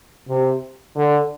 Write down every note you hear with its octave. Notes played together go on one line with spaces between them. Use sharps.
C3
D3